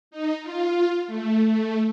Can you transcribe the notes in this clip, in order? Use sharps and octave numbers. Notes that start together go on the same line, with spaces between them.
D#4
F4
A3
A3